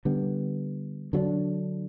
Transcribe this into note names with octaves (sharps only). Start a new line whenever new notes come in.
D3 G3 B3
D3 F#3 B3 D4